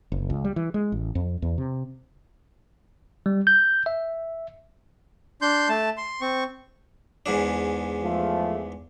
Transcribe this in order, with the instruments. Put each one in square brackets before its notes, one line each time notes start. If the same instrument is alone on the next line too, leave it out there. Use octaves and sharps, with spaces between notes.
[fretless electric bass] F#1
C#2
G3
E3
G#3
A1
F2
E2
C3
[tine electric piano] G3
G6
E5
[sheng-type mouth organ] D4 C6 G6
A3 A5
C6
C4 C#6
[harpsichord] E2 G#2 D4
[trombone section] F3 A3